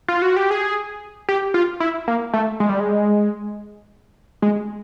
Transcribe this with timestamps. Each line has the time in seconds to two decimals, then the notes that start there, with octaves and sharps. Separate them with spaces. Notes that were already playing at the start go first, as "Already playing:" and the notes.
0.08 F4
0.22 F#4
0.37 G4
0.51 G#4
1.29 G4
1.54 F4
1.80 E4
2.08 A#3
2.34 A3
2.60 G#3
2.69 G3
2.80 G#3
4.42 G#3